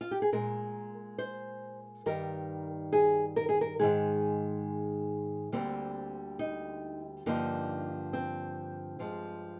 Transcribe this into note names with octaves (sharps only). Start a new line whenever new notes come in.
F4
G4
G#4
A#2 G#3 A#4
C5
G2 D#3 G3 A#4
G#4
A#4
G#4
A#4
G#2 D#3 G#3 G#4
D2 D3 G3 A#3 C4
D#4
G2 D3 F3 A#3 D#4
C4
G2 F3 G#3